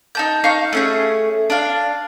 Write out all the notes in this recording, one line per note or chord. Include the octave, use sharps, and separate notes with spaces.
D#4 A5 G6
D#4 F5 C#6 G6
A3 C#4 G#4
D4 F5